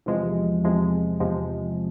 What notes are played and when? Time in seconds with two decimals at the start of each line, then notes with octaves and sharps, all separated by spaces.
0.06 E2 C3 F3 G#3
0.64 E2 C3 F3 G#3
1.20 E2 C3 F3 G#3